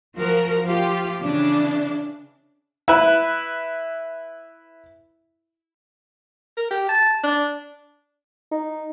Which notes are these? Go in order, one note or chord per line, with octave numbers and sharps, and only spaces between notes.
F3 F#4 A#4
F3 F4 G4
C#3 E3 D4
E4 B4
A#4
G4
A5
D4
D#4